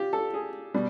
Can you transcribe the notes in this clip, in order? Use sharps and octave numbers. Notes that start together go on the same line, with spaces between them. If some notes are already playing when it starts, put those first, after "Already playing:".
Already playing: F4 G4
A4
G#4
B2 G3